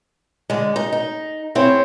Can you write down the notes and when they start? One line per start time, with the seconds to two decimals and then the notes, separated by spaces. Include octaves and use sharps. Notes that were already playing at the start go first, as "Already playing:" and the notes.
0.50 D3 G#3
0.76 D#4
0.93 D#4
1.55 C4 E4 G#4 C#5